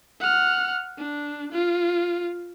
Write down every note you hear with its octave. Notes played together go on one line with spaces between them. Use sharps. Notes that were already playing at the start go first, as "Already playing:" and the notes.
F#5 F6
D4
F4